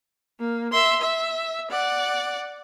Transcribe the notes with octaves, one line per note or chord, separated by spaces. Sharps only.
A#3
E5 C6
E5
D5 F#5